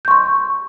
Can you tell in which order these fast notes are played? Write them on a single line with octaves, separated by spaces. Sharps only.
G6 C#6 C6